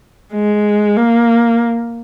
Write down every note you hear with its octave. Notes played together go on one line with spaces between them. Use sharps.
G#3
A#3